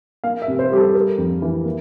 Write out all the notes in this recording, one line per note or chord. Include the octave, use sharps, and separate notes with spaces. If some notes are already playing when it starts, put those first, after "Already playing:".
A#3 F5
E5
C3
C5
G3 G4
A4
G3 A#4
F2
E3
A#3